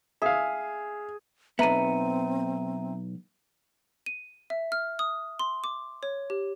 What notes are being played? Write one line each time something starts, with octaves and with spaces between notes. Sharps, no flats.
G#4 E5 F5
B1 B3 C4 E5 A#5 D#7
D#7
E5
F6
D#6
C6
D6
C#5
G4